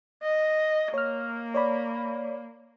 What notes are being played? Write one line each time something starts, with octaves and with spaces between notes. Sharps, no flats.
D#5
A#3 C#5 F6
C#5 D5 B5